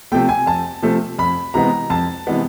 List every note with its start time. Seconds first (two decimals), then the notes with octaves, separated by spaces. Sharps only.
0.12 C3 F3 A3 G5
0.29 G#5
0.46 F2 A5
0.82 C3 F3 A3
1.19 F2 B5
1.54 C3 E3 G#3 B3 A#5
1.90 F2 A5
2.27 C3 E3 G#3 B3